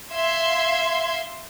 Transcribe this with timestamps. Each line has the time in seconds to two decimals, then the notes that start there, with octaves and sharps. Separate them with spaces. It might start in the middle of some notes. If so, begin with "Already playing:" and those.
0.13 E5 F5 C6 G#6